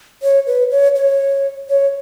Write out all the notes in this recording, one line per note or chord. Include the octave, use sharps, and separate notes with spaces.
C#5
B4
C#5
C#5
C#5